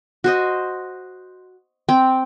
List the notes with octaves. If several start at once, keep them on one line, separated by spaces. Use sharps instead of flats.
F#4 C5 D#5
C4 G5